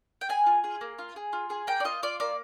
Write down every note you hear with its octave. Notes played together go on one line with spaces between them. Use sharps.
G5
G#4 G#5
F4
G#4
A#3
F4
G#4
F4
G#4
A#3 G5
D5
F4 D#5
F4 D5
A#3 D5